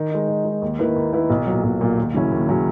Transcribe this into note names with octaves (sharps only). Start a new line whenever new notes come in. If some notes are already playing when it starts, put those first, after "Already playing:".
Already playing: D#3
G#3 D#4
D#3
G#3 D#4
D#2
D#3 A#3 E4 B4
D#2
D#3 A#3 E4 B4
B1
A#2 F#3
B1
A#2 F#3
D#2
C#3 F#3 C#4 E4
D#2
C#3 F#3 C#4 E4